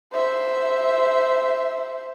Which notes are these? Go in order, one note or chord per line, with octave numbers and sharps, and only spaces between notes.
C5 E5